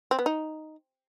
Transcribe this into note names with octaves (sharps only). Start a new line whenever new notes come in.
C4
B3
D#4